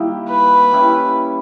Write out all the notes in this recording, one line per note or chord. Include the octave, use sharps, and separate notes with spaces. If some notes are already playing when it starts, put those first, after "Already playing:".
Already playing: G2 D#3 A#3 E4 G4
B4
G3 C#4 E4 G4